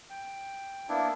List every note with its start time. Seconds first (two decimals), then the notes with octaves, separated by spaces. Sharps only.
0.10 G5
0.89 A#3 B3 D4 E4